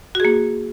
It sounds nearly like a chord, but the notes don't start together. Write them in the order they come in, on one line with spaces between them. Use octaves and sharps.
F#4 G#4 A#3